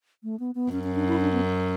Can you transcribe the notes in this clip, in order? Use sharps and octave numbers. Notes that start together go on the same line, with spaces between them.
A3
B3
B3
F#2 C#4
C#4
D4
E4
D4
B3
C#4